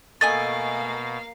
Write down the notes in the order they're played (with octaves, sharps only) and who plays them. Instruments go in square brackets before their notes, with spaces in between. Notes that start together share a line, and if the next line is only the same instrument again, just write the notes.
[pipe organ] B2 [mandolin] A3 D#5 G#5 [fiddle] A#3 F5 [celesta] A6